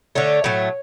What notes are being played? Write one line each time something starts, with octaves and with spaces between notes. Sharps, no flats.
D3 A3 C#5
A2 F#3 A3